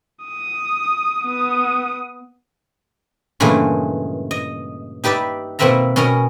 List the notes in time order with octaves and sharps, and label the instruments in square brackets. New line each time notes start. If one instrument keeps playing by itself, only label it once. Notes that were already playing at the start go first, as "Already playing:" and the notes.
[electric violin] D#6
B3 D#6
[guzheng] G2 A#2 C#3 E3 G#3 A3
D#5
D#4 G4 B4 D5 E5
B2 A#3 C4 B4 E5 A#5
B2 C#4 A#4 D#5 A#5